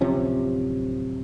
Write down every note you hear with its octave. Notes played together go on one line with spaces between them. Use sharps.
D1 C3 F3 C#4